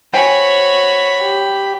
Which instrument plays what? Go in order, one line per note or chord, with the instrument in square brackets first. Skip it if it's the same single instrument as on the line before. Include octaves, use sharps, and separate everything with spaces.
[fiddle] F#4 C#5 [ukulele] C5 G5 G#5 [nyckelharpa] B5
[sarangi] G4